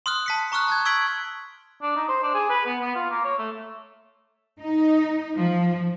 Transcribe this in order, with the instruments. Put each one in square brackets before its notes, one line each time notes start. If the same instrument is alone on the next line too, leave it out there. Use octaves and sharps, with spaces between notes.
[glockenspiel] C6 D#6 F6 F#6
A5 B6 C#7
A#5 C#6 D#6 F6 F#6
A5 F#6 G#6
C#6 E6 G#6 B6 D7 F#7
[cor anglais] D4
D#4
C5
D4
G#4
B4
B3
B3
F4
A#3
C#5
A3
[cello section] D#4
F3